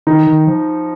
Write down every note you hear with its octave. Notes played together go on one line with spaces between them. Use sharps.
D#3 D#4
D#3
F3